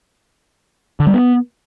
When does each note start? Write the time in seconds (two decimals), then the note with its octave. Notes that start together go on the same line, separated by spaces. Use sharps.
1.00 D3
1.07 G3
1.14 B3